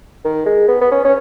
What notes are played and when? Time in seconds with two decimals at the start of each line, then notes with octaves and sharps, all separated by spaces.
0.25 D#3
0.46 G#3
0.68 B3
0.81 B3
0.92 C#4
1.05 C#4